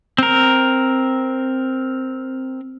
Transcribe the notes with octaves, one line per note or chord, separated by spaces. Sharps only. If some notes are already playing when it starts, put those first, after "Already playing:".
C4 A#4